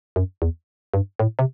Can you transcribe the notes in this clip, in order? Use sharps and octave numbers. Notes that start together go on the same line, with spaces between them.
F#2
E2
G2
A2
C3